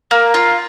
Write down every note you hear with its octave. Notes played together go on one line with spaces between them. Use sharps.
A#3
F4